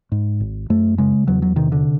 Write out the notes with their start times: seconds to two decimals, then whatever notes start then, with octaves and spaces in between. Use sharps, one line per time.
0.12 G#2
0.40 G#1
0.70 F#2 A3
0.98 C#3 G#3
1.28 E2 F#3
1.42 F#3
1.56 C3 D#3
1.72 D3